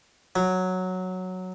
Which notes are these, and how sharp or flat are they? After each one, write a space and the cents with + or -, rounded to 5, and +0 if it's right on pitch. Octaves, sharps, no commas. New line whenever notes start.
F#3 -5